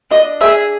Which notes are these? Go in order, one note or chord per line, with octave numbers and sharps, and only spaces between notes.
D4 D#5
G#4 E5